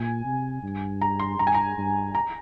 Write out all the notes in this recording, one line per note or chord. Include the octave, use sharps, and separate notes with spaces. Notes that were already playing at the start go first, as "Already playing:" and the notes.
Already playing: A#2 G#5
C3
G2
A#5
C6
G2 A#5
G#5
A#5
G2
A#5